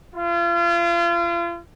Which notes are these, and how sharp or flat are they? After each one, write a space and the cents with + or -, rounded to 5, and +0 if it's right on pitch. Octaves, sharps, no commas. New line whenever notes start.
F4 -35